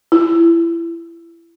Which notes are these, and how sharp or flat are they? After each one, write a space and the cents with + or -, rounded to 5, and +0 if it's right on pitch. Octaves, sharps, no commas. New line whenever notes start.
E4 +30